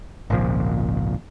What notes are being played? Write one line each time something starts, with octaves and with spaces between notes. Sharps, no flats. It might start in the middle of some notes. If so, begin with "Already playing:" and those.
G#1 C#2 A#2 F3